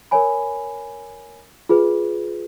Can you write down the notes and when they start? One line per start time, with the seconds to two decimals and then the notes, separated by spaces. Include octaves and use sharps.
0.11 A#4 C#5 G#5 B5
1.69 F4 G#4 B4